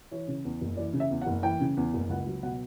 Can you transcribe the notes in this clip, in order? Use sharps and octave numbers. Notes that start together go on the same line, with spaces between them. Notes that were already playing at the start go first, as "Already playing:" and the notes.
E3 C#5
C#3
E2
F#1
E3 D5
C#3
E5
E2
F#5
F#1
E3 G5
C#3
E2
F#1
C#2 F#5
F#3
B2 F#5